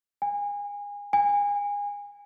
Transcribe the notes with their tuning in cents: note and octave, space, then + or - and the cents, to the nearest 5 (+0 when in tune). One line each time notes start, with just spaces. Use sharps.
G#5 -30
G#5 -30